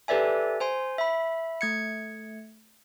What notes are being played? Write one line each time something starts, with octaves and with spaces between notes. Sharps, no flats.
G4 A4 B4 D5 E5 G#5
C5 G#5 C6
E5 B5
A3 G#6 C#7